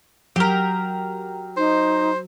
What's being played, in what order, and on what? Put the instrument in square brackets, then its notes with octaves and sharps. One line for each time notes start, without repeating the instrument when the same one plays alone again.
[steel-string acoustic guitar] F#3 [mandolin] G4 A#4
[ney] D#4 [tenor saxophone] C5